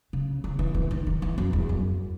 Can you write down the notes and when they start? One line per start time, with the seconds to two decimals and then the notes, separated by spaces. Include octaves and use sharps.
0.13 C#3
0.44 D#3
0.59 E3
0.75 E3
0.91 D#3
1.07 D#3
1.22 E3
1.38 F#2
1.53 E2
1.69 F#2